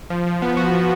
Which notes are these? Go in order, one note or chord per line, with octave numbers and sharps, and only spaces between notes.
F3
F3
B3
F#4
F3